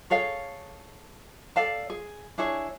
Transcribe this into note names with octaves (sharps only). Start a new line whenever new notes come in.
G#4 A4 C#5 F5
A4 D5 F5 A5
G#4
D4 E4 G#4 C#5